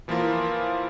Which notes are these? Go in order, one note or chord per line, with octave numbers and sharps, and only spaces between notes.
E3 F3 A#3 E4 F4 A#4